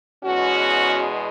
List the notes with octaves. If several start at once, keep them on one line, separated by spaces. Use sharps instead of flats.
E2 B2 G#3 C#4 F#4